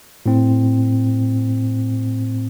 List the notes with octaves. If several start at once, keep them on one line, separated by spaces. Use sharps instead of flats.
A2 C4